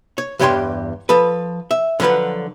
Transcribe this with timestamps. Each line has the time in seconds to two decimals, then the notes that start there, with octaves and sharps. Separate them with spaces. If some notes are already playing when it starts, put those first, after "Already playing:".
0.18 C#5
0.39 E2 G2 G4 C#5 G5 C6
1.09 F3 A4 B4
1.71 E5
2.00 D3 F3 F#3 B4 F#5